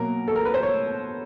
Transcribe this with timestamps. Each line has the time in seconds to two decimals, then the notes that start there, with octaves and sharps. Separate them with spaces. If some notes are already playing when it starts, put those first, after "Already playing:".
Already playing: B2 F#3 A#3 A#4
0.28 A4
0.36 A#4
0.45 B4
0.54 C5
0.63 C#5